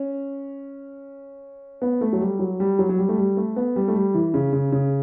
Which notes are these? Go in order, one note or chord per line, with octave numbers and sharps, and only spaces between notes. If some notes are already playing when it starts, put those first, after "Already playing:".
Already playing: C#4
B3
A3
F#3
G3
F#3
G3
F#3
F#3
G3
A3
G3
A3
B3
G3
A3
G3
E3
C#3
C#3
C#3